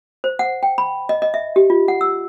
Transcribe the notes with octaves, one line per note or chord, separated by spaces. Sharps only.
C5
F#5
G5
B5
D#5
D#5
E5
G4
F4
F#5
E6